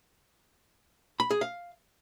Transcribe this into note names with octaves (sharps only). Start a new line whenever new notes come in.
B5
G#4
F5